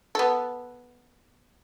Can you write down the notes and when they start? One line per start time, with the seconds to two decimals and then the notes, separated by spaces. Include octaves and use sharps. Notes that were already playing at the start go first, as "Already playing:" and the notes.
0.15 B3 A4